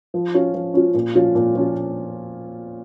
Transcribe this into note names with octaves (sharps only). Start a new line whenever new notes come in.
F3
C#4 F4
F3
C#4 F4
A#2
F3 C#4 F4
A#2
F3 C#4 F4